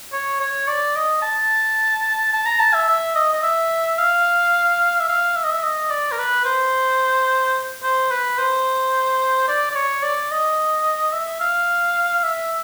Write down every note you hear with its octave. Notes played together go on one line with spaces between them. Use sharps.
C#5
C#5
D5
D#5
A5
A5
A#5
A5
E5
E5
D#5
D#5
E5
F5
E5
F5
E5
D#5
E5
D#5
D5
A#4
B4
C5
C5
B4
C5
D5
D5
C#5
D5
D#5
E5
F5
E5